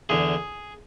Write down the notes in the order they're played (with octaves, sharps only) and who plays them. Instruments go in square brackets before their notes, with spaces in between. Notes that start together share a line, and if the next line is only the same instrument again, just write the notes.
[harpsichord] E2 D3 G#4